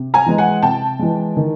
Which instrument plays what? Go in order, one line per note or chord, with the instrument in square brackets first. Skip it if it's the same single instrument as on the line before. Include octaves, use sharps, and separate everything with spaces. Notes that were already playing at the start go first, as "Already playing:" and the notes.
Already playing: [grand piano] C3
[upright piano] G#5 A#5
[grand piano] E3 G#3
[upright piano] F#5 G#5
[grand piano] C3 [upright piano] G5 A5
[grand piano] E3 G#3
D#3